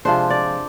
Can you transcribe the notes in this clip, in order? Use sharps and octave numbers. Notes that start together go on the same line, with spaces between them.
C3 F3 G#3 D4 C5
D5